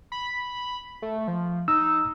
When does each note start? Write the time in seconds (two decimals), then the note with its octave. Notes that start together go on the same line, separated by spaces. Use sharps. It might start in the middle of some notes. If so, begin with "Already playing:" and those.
0.12 B5
1.02 A3
1.28 F3
1.68 D#4 E6